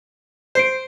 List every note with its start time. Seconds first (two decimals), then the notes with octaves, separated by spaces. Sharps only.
0.55 C5 G6 C7 D7